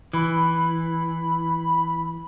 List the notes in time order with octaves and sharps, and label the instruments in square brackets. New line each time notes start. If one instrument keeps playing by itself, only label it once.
[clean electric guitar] E3 [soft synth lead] B5